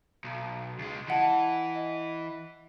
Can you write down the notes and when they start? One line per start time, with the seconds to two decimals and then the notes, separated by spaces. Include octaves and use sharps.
0.24 B1
0.79 C#2 G#3
1.08 E3 D#5 F#5 A5
1.76 D#5